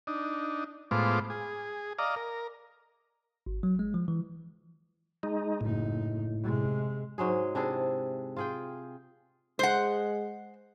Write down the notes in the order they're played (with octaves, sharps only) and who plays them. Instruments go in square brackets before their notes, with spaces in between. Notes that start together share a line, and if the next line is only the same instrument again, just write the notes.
[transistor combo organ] D4 D#4
A2 G#3 B3 F4 C5 D6
G#4
D5 D#5 F5 A#5
A#4
[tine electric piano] G#1
F#3
G#3
F3
E3
[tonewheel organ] G#3 D#4
[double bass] F#1 D#4 [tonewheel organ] A2
[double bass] C3 G#3
[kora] G#2 F#3 G#3 G#4
C3 D4 E4 G#4
F4 G#4 G5
[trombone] G#3 [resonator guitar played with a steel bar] C5 F#5